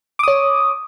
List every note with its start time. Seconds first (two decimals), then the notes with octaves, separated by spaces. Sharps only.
0.19 D6
0.23 D#6
0.28 C#5